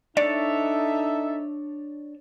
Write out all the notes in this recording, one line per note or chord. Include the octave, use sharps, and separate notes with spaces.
D4 D#4 A4 C#5 D5 E5 A5